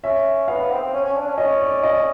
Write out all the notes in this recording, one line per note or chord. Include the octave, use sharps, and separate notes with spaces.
C#4 E5
B3 F5
B3
C4
C4
C#4
C#4
D4
C#4
C#4 D#5
D5
D#5